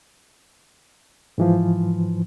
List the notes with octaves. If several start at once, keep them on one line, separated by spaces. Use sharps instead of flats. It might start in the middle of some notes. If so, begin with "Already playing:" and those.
G#2 E3 F3